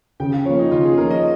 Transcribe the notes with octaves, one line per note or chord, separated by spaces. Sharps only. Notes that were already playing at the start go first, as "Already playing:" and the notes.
C#3 G5
F5
F3 A#3 C#5
D#4
C#3 F4
G#4
F3 A#3 A#4
D#5